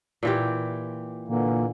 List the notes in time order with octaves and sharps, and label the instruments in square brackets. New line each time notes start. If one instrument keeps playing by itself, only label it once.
[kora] A#2 E3 G4
[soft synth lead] A#2 [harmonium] D3 E3 A#3